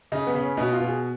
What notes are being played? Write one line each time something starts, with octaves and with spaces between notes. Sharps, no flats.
C#3 D#4
B3
C#3
C#4
B2 D#4
F4
B2
G#4